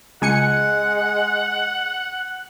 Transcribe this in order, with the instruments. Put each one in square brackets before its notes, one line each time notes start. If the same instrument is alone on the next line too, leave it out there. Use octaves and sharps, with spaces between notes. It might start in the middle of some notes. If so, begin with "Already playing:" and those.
[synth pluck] C#2 G#5 C#7 [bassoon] G#3 [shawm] F#5